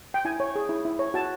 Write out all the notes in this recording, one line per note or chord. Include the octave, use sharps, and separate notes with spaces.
G5
E4 G#5
C#5
G#4
E4
E4
C#5
F#4 A5